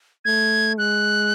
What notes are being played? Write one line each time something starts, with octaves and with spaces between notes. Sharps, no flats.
A3 G#6
G#3 F#6